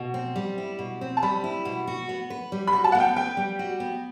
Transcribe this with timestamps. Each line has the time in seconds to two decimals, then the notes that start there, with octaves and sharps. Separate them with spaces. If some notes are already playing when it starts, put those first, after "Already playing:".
Already playing: B2
0.14 C4
0.36 G3
0.58 E4
0.79 B2
1.01 C4
1.17 A5
1.22 G3 B5
1.44 E4
1.65 B2
1.87 F#4
2.09 B3
2.30 B4
2.52 G3
2.67 B5
2.73 F#4
2.84 A5
2.92 B3 F#5
3.00 G5
3.16 B4 G5
3.37 G3
3.59 F#4
3.80 B3